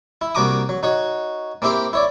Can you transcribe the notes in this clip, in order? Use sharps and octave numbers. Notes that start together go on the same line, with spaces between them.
E4
C2 A#3 F#4 A#5 D6 D#6
F#3
D#4 F#4 C#5
A#3 C4 E4 G4 C5
E4 C#5 D5